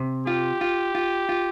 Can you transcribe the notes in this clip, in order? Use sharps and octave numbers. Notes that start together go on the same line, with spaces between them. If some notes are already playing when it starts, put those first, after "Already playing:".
Already playing: C3
F4 G4
F4
F4
F4